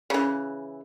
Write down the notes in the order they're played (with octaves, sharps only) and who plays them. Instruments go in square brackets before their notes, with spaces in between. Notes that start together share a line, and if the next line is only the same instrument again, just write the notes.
[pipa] C#3 E3